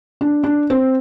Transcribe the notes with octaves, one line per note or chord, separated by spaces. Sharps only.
D4
D4
C4